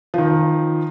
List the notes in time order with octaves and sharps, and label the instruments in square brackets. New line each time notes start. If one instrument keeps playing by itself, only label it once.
[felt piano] D#3 F3